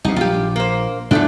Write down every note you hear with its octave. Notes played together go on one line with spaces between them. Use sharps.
C2 B2 D#4
A#1 F4 G4
A#3 C5
G#2 B2 E3 F3 A3 D4